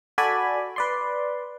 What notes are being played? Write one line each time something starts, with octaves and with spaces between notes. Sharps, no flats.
F#4 A4 D5 G#5 B5
B4 D5 C6